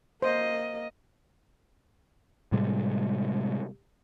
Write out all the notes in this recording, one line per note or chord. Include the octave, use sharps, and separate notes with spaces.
A#3 C5 D#5
A2 C3 G3 G#3